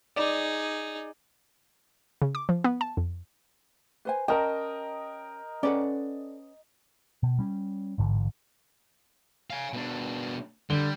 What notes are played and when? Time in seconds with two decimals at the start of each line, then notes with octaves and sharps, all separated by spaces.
0.16 D#4 G#4 D5
2.22 C#3
2.35 D6
2.49 F3
2.64 B3
2.81 A5
2.97 F2
4.05 B4 C5 G#5
4.28 C#4 D4 A#4 D#5 G5 A5 A#5
5.63 C#4 A4 B4 D5 F#5
7.23 B2
7.39 G3 C#4
7.98 A1 G#2 D3
9.50 F5 G#5
9.73 B2 D4
10.70 D3 G3 G7